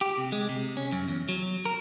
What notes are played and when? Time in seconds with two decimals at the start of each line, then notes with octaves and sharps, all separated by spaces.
0.01 G4
0.18 C3
0.32 G#3
0.49 C3
0.77 C#4
0.92 F#2
1.08 E2
1.29 F#3
1.65 A#4